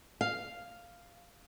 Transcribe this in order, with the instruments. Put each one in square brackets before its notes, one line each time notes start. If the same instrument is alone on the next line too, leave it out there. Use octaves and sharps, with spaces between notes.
[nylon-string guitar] F5